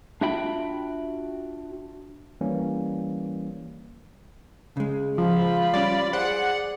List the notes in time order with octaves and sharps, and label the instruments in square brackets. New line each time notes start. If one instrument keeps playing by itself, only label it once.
[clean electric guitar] D4 F4 F#4 E5 G5 B5
[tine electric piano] E3 G3 A#3 C#4
[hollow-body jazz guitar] C#3 G#3
[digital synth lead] F3 [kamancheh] F4 B5
[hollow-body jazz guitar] G3 C#4 [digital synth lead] D5
[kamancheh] G#4 D5 [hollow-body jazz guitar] C5 [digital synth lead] F#5